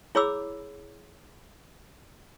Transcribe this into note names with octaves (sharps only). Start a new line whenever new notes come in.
E4 G#4 C#5 B5 D6 E6